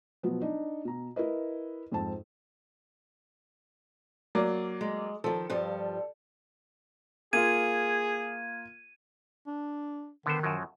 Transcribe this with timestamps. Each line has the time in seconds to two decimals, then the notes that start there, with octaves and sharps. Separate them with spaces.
0.23 B2 F3 F#3 B3
0.41 D4 D#4
0.85 B2 A#5
1.16 E4 A#4 B4 D#5
1.92 F2 G#2 C4 A5
4.35 F#3 A#3 D5
4.81 G#3
5.24 D#3 F3 A4
5.50 G2 F3 G3
7.33 A#3 F4 G#4 G#6 D#7
9.47 D4
10.26 D3 D#3 B3 C5
10.43 F#2 F3 F#3